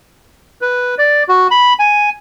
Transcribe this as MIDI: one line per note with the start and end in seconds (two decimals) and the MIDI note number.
0.61 0.95 71
0.98 1.23 74
1.29 1.47 66
1.51 1.74 83
1.79 2.10 80